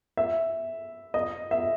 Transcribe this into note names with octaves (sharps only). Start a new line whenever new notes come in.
E5
D#5
E5